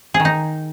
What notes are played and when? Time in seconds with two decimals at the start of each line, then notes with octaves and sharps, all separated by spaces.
0.14 G#4
0.20 D#3
0.25 D#4